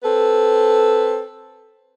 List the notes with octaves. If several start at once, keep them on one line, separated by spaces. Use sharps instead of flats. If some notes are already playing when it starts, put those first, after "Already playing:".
C4 A4 B4